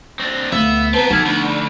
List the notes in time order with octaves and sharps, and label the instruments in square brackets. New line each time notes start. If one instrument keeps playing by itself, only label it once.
[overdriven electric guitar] C4 D4
[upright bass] D2 [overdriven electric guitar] B3 [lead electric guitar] E5 [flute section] F5
[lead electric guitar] C4 A#4 [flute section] B4 A5
[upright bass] F3 D#4 [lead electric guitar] F#4 A4 [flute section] F6 G#6
[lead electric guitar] D2 [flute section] D4 B5